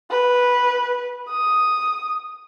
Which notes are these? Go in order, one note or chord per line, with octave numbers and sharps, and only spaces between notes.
B4
D#6